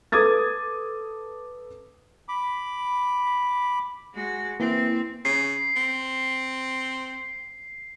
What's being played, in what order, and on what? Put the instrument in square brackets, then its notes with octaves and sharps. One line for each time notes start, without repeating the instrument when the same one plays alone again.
[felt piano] A4 B4 D6 D#6 G#6 A6
[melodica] B5 D6
[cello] G#3 F#4
[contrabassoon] E3 [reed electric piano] A#3 [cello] C4
[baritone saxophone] C#3 [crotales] C7
[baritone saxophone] C4